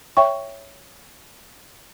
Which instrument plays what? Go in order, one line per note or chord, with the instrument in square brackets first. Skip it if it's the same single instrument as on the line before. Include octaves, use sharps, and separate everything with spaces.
[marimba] C#5 E5 G5 C#6